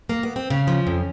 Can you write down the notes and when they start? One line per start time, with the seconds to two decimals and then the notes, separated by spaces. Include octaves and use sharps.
0.09 A#3
0.23 B3
0.36 C4
0.50 C#3 C#4
0.67 F3
0.87 F2